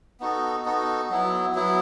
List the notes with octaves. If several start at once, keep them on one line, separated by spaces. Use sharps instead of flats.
B3 D#4 F#4 A4
B3 D#4 F#4 A4
F#3 B3 E4
F#3 B3 E4